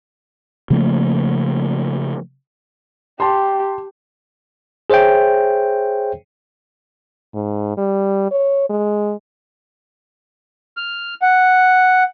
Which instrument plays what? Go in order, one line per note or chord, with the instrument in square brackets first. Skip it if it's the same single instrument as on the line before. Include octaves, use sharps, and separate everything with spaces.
[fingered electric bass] C#3 F3 A3 A#3
[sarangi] G4 [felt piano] A5 C6
[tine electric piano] G#4 C5 C#5 E5 G5
[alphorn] G#2
G3
C#5
G#3
[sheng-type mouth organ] F6
F#5